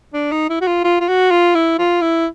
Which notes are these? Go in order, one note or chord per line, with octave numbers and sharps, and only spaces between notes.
D4
D#4
E4
F#4
F4
F4
F4
F#4
F4
E4
F4
E4